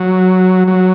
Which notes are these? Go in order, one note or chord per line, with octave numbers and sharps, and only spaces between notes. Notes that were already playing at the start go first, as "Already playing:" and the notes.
Already playing: F#3
F#3